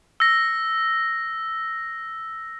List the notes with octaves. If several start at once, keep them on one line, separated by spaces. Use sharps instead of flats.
E6 A#6